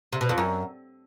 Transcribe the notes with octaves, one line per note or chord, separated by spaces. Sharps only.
C3
B2
F2
F#2